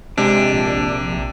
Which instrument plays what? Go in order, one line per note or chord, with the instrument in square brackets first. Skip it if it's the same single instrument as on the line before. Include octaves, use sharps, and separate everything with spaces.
[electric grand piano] C3 [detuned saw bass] G#3 [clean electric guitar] D4
[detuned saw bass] A#1